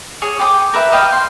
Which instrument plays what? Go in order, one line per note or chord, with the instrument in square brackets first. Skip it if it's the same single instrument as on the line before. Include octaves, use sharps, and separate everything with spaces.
[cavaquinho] G#4 C#5 C#6
G4 G5 C6 D#6
A#4 B4 E5
A#4 D#5 F5 G5
C6